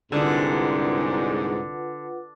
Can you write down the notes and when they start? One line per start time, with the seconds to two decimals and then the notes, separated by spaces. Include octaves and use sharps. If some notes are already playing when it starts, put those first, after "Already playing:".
0.12 C2 G#2 D3 F4 B4 F#5